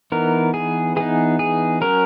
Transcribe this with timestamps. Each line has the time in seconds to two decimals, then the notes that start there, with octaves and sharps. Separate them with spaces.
0.12 E3 B3 D#4 A#4
0.54 G#4
0.96 E3 B3 D#4 G#4
1.39 G#4
1.81 F#3 C#4 A#4